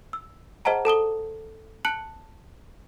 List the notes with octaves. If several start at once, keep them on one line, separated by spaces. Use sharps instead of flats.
E6
G#4 C5 D#5 F#5 A5 A#5
A4 A5 D#6 G7
A5 F#6 C#7 F#7